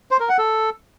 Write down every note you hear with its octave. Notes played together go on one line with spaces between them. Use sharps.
C5
A#4
F#5
A4